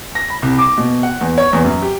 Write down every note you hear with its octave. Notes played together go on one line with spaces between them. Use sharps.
A#6
B5
C2
D6
B2
F#5
E2
C#5
E2
F#2
G4